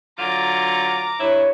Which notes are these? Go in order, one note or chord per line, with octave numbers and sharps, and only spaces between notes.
D3 F#3 F4 A#5 D6
G2 B3 E4 C#5